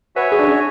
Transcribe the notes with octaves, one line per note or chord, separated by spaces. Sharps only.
F#4 B4 C#5 E5 G#5
G#4
D4
C#4